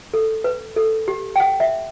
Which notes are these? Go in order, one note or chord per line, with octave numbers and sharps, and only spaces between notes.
A4
B4
A4
G4
G5
F#5
E5